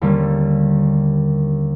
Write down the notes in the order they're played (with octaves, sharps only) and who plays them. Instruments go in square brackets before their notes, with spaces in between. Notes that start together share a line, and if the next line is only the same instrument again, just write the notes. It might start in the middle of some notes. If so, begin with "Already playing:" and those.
[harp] D#2 D3 G3 A#3 C#4